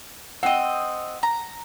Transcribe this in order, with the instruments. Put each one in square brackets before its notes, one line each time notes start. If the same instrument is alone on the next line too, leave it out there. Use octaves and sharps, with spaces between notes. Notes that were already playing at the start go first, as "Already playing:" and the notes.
[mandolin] C4 D#5 [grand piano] F#5 G5
[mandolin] A#5